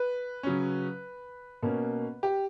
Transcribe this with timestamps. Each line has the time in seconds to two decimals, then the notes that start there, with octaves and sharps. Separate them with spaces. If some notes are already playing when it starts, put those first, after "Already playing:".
Already playing: B4
0.43 C#3 F#3 C#4
1.63 B2 A#3 C#4
2.23 G4